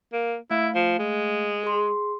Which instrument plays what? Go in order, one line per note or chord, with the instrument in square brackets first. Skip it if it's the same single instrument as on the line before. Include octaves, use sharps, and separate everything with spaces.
[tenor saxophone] A#3
[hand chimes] A3 F5 [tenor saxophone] E4
[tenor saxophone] F3
G#3
[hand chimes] G#4 C6